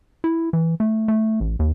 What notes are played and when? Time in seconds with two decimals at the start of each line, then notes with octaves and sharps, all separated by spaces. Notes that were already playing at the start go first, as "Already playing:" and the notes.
0.24 E4
0.53 E3
0.80 A3
1.08 A3
1.40 A1
1.59 D#2